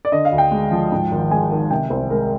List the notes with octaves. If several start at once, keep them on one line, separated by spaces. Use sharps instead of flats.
D5
D3 D#5
F5
D2
G5
G#3
F3
G#2
G#1
G#3 G#5
D#3
C3 G5
C2 C5
G#3 A#4